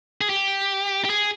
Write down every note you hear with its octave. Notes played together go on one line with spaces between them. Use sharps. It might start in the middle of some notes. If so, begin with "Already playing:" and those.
G#4
G4
G4
G#4